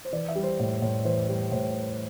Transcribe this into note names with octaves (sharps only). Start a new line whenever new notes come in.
C5
E3 D5
E5
G3
C5
A2
A2
E3 C5
G3
A2 C5